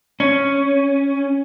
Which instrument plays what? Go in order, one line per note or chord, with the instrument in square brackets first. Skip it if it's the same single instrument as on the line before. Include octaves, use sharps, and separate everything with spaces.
[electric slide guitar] C#4